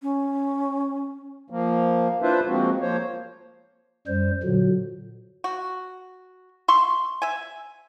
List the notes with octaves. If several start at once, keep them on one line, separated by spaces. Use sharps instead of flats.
C#4
F3 A#3
D4 E4 F4 B4 C5 E5
F3 G#3 A#3 C4 F#4
F3 A#3 C5 C#5
F#2 G3 C5
A#2 D3 F#3
F#4
E5 C6 C#6
E5 G#5